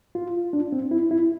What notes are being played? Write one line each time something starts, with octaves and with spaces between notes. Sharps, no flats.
F4
D4
C4
E4
E4